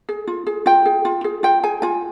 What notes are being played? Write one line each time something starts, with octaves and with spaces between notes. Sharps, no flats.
G#4
F4
G#4
F4 G5
G#4
F4
G#4
F4 G5
G#4 G#5
F4 G#5